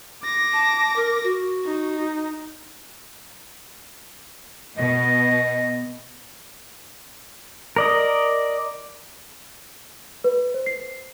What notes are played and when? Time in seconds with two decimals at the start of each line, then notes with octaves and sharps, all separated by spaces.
0.23 D6 A#6
0.53 A5
0.96 A#4
1.24 F#4
1.66 D#4
4.77 B2 D#5
7.76 A#4 D5 D#5
10.24 B4
10.54 C5
10.66 C7